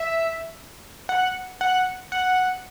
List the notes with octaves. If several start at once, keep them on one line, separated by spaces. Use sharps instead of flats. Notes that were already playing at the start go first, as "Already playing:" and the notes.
Already playing: E5
F#5
F#5
F#5